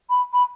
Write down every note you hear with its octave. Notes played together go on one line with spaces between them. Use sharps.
B5
B5